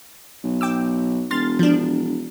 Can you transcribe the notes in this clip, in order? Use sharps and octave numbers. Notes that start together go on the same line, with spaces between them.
B1
G5 D6 E6
E1 C6 F6 A6
F3 D4